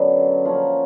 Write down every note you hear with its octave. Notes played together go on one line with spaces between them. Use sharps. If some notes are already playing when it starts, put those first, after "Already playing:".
Already playing: F#2 D3 F#3 B3
F3 A#3 C#4